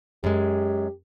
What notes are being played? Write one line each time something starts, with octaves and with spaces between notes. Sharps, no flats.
F#2 G#3 G4